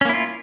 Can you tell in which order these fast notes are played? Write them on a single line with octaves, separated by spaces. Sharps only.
C#4 A#3 E4 F4